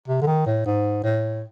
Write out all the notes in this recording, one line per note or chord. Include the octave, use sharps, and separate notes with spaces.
C3
D3
D#3
A2
G#2
A2